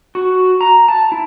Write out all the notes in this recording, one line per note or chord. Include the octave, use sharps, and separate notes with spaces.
F#4
A#5
A5
E4